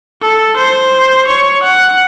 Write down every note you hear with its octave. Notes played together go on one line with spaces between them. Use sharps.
A4
C5
C#5
F#5